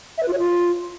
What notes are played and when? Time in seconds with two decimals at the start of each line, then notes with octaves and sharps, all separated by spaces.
0.17 E5
0.23 B4
0.28 F4
0.33 C#5
0.38 F4